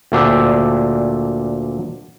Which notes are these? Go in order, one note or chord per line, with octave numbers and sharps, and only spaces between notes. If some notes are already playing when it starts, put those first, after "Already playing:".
D2 A#2 D4 G4 E5